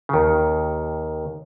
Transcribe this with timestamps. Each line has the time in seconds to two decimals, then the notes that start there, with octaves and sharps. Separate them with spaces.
0.09 C#3
0.13 D#2 D#3